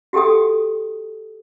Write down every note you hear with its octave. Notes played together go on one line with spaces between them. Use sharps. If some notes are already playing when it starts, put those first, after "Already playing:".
F#4 G4 A4 G5 D#6